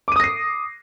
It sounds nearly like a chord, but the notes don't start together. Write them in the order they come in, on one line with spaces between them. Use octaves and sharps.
D6 D#7 D#6 A#6 C7